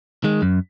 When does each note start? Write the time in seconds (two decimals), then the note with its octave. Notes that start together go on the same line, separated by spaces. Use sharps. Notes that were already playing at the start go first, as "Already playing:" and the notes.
0.24 D#3 G#3
0.42 F#2